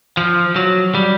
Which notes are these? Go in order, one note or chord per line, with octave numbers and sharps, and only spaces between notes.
F3
F#3
G3